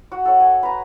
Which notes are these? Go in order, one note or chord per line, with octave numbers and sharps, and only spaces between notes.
F#4 F#5
A4 C#5
G#5
B4 A#5